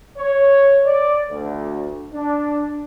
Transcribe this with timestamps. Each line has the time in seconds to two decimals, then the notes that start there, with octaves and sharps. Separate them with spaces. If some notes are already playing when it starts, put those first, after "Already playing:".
0.18 C#5
0.87 D5
1.30 D2
2.14 D4